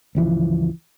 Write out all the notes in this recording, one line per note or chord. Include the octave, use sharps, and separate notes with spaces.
G1 C#2 E3 F3